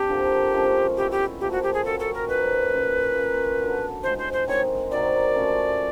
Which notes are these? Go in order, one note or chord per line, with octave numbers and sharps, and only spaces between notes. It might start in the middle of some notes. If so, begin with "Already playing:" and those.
Already playing: C4 D4 G4
D3 F3 A#3
F3 G#3 C#4
G3 B3 E4 G4
G4
A#2 F3 A3 G4
F#4
G4
G#4
G3 A#3 C#4 F#4 A4
A4
A#4
F3 A#3 D#4 B4
A#3 C#4 F4 G#4
A#3 C#4 F4 A#4
D3 F#3 B3
A2 F3 G#3 C5
C5
C5
D#3 G#3 C4 C#5
C3 D#3 F#3 D5
F3 A3 C#4